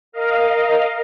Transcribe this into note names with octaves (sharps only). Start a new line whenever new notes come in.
A#4 D#5 F5